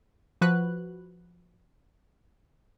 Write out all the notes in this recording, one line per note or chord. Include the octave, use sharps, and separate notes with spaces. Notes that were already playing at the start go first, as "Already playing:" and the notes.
F3 F#4 B4 F#6